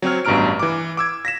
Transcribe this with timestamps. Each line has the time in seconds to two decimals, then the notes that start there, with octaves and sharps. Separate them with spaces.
0.02 F#3 C4 C#5 F6
0.25 A1 G2 B2 A#5 F6 D7
0.59 E3 D6
0.97 D6 E6 G#6
1.25 A#6 B6 E7